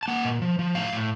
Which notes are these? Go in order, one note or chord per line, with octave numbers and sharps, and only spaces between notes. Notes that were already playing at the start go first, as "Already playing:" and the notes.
A5
A#3 F#5
A#2
F3
F3
A2 F5
A2